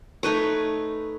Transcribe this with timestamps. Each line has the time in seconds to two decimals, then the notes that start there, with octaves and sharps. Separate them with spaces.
0.23 A3 D#4 B4 C#5